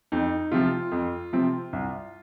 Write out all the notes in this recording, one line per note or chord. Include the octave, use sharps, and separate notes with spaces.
F2 D#4
C3 F3 C4 F4
F2
C3 F3 C4
C2